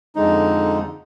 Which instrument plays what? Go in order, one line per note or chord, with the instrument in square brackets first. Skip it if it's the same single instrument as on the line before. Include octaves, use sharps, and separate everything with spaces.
[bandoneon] F2 D3 G#3 D#4